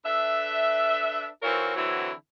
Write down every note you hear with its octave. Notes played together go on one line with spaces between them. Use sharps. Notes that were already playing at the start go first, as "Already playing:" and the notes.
D4 A4 B4 E5
E3 C4 F4 F#4 A#4 C#5
D3 E3 F#3 C4 E4